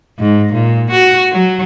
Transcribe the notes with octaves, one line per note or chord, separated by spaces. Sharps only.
G#2
A#2
F#4
F#3